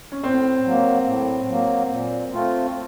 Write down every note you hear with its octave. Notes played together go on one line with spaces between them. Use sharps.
C#4
A2 C4
F#3 A#3
A2
F#3 A#3
A#2
A3 C4 F4